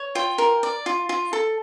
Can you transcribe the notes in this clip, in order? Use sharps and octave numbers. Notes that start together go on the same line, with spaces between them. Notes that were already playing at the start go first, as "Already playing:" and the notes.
Already playing: C#5
F4 G5
A#4
D5
F4
F4
A4